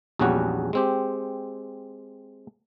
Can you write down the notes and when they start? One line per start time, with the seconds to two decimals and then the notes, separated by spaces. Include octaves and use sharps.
0.19 A#1 E2 G3 C#4 F#4 F#5
0.73 G#3 C4 G4